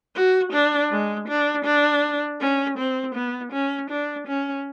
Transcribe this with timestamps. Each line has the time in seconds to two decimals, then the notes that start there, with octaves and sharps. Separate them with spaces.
0.15 F#4
0.53 D4
0.91 G#3
1.28 D4
1.65 D4
2.40 C#4
2.78 C4
3.15 B3
3.52 C#4
3.90 D4
4.27 C#4